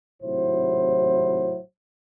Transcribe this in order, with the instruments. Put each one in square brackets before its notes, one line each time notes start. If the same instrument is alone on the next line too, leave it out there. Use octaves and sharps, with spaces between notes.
[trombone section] G#1 A2 C3 F#3 E4 C5